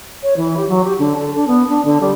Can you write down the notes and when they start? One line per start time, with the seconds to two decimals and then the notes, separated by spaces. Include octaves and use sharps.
0.22 C#5
0.36 E3
0.56 G4
0.68 F#3
0.84 G4
0.98 D3
1.20 A4
1.35 D4
1.47 B3
1.69 D4
1.85 D3
2.00 G3